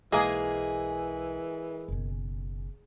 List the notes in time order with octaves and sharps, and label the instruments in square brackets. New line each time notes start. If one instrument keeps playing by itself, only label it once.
[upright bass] B1 [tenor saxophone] E3 [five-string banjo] G#3 A#3 [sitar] G#4
[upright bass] F#1 B2